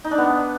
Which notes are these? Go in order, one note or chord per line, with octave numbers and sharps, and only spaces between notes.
D#4
D4
B3